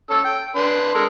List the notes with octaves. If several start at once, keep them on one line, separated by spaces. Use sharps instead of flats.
C#4 A4 E6
G5
D4 B4 C6
G#3 A4 A#4